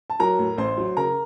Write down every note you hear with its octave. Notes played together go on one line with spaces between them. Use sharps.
A5
F#3 A#4 A#5
A2
A1 C5 C6
F#3
C#3 A#4 A#5